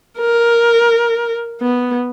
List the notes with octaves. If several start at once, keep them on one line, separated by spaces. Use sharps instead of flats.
A#4
B3